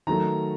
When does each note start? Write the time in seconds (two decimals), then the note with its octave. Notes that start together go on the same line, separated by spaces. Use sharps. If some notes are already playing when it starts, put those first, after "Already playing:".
0.07 D#3 F#3 A3 A#5